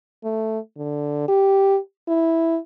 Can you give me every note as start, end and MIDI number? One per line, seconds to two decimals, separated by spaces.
0.24 0.59 57
0.77 1.27 50
1.28 1.78 67
2.08 2.58 64